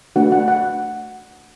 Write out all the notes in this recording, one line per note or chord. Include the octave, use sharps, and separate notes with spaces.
A3 D4 F#4 F#5
F#5
F#5